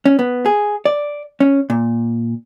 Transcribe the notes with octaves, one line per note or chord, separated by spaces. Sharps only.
C#4
B3
G#4
D5
C#4
A#2